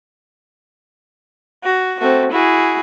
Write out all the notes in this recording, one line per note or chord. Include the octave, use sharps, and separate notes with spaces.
F#4
A3 C4 F#4
E4 F#4 G#4